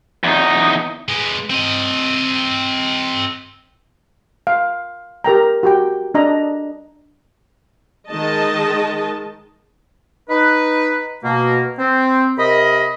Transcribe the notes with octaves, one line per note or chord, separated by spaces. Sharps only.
E2 D#4
G#3 B3
C4 D#5
F5
G4 A#4 G5 A#5
F#4 G4 G5
D4 D#5 A#5
D#3 G#3 D#5 A5
D#4 B4
B2 A#3
C4
C3 A#4 D#5 B5